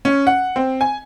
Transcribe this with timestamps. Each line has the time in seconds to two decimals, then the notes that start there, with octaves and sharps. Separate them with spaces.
0.05 C#4
0.27 F#5
0.56 C4
0.81 G#5